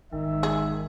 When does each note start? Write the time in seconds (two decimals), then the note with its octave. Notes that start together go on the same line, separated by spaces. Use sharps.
0.12 G#1 D#3 E5
0.43 G#4